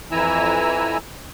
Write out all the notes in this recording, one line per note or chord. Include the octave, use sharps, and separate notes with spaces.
F2 E3 E4 G#5 A#5 E6